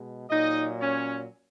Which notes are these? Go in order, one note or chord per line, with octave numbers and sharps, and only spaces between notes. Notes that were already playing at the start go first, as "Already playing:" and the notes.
Already playing: B2 G#3
A#2 F#3 D#4 D#5
C#4 C#5